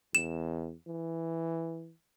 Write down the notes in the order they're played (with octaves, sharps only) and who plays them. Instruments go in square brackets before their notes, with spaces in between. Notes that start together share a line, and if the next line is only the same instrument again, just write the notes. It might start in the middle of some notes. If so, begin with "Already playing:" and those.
[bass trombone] E2 [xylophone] E7
[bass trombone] E3